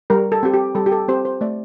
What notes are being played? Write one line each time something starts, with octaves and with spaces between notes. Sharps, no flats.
G3 A#4
A4
C4 G4
G4
G3 A4
G4
A4
C4 G4 C5
C5
A3 D5